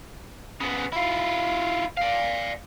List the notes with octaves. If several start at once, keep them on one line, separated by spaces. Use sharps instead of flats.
C#3 B3
E4 F4
D5 F5